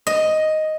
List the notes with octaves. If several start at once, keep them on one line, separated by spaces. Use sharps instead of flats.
D#5